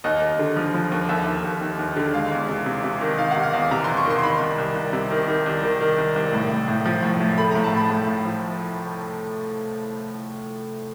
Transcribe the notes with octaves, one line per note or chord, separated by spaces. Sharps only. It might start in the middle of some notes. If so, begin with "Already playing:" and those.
D#2 D#5
D#2
D3
F3
F3
D#2
D#2 E5
D#2
D#2
D#2
D#2
D3
G#3 F5
E2
C3
C3
C3
D#3
D#3 F5
F#5
C3
F5
E2
C3 A#5
E2 C6
C#6
D#3 C6
C6
D#3 B5
C2
C2
C2
C3
D#3
D#3
C2
D#3
D#3
C2
C2
A2
A2
A2
F3
A2
A2
A3 B5
A2 A#5
A5
A2 B5
A2
A2
F3